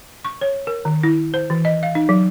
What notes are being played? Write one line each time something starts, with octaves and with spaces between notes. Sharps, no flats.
C#6
C#5
A#4
D#3
E4
C5
E3
D#5
F5
D#4
F#3